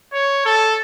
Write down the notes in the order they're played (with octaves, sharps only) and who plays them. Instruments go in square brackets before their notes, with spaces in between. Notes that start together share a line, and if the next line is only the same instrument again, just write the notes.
[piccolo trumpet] C#5
A4